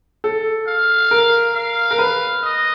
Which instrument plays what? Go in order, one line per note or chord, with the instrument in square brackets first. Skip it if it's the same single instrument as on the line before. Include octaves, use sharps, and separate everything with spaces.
[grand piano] A4
[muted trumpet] F5
[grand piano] A#4
[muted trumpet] F5
[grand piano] A#4
B4
[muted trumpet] D#5